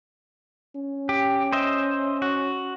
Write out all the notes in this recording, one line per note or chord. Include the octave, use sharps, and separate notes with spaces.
C#4
G4
C5 D#5 E5
F#4